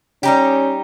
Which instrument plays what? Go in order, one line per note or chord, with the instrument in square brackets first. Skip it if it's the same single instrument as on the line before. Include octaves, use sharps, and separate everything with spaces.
[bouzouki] G3 D#4 G4 [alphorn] C#4